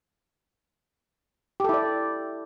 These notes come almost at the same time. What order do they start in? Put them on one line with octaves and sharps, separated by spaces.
G4 A4 E4 D5